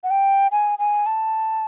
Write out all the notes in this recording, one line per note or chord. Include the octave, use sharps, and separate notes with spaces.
F#5
G5
G#5
G#5
A5